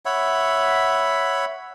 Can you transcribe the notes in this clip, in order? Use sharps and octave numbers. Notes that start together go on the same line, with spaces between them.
C#5 E5 F#5 B5